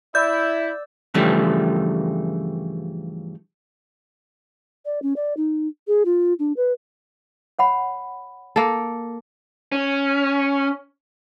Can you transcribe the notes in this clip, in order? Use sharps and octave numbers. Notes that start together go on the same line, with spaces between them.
E4 D5 E5 E6 G6
G2 C#3 E3 F3 G3 A3
D5
C#4
D5
D#4
G#4
F4
D4
B4
C#5 F#5 B5
A#3 A4
C#4